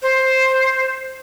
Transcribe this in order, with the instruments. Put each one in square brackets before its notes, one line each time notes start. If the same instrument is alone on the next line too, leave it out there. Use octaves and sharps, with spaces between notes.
[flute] C5